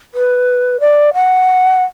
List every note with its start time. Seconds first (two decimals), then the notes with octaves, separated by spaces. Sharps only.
0.14 B4
0.80 D5
1.14 F#5